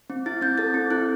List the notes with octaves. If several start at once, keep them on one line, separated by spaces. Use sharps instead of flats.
C4
E4 A6
C4 G6
A4 A6
C4
E4 F#6